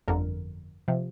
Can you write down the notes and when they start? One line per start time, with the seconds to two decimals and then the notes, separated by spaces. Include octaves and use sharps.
0.08 G1 F2 D3 A#4
0.88 C3 F3